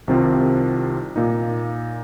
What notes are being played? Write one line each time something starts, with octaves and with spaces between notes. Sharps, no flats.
C2 C3 D#3 C4 F4
A#2 A#3 D#4